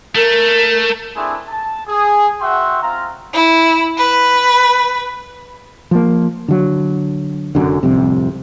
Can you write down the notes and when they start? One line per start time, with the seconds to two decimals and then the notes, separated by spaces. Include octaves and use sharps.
0.15 A3 A#4
1.16 A3 C4 D4 E4 G#4
1.48 A5
1.87 G#4
2.40 F#4 E5 F#5 G5 C6
2.82 C4 F4 F5 A#5
3.33 E4
3.98 B4
5.91 F3 A#3
6.48 D3 F#3
7.55 F1 F#2 D3
7.83 D1 C2 F2 C3